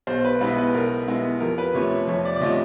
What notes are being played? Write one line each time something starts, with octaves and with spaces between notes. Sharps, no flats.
B1 C5
B4
B2 G#3 B3 E4 B4
B4
B1 A#4
B2 G#3 B3 E4
F2 A#4
B4
C3 F3 A3 C#4 C#5
C#5
F2 C#5
D5
D5
C3 F3 A3 C#4 D#5